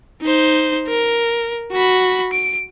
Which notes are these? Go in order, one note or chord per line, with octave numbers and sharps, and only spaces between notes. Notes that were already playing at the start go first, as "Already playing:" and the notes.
D#4 C5
A#4
F#4 B5
D7